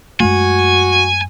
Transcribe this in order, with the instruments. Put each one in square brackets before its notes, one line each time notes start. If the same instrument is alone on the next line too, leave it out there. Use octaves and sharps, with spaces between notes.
[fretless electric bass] F#2 G#3 A3 [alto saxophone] F#4 [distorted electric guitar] G#5